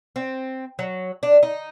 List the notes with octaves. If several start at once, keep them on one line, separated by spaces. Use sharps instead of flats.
C4
F#3
D4
D#4